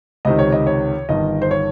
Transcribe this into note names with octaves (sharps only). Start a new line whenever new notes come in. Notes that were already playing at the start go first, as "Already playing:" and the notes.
C#2 C3 D#3 D#5
C#5
D#5
C#5
G1 G2 D#3 D#5
C5
C#5